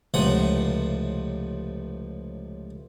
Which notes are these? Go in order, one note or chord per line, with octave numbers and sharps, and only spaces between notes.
C#2 A2 C3 F3 F#5 D#6